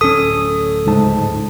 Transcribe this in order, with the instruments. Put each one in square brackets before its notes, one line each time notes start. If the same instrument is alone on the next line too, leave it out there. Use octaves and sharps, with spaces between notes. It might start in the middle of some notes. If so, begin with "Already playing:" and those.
[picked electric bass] D1 C#4 [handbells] A4 D#6
[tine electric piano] C#2 G#2 A5